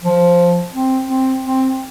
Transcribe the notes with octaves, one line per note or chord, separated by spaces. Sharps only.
F3
C4
C4
C4